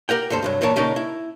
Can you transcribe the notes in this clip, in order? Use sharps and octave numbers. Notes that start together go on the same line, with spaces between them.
G4 A#4 F#5 G5
D2 G2 A4 C5
C2 G2 F#3
E2 A#2 E3 A#4 C#5 A5
A#2 C#3 C#4 D#4 A#4 A5
E4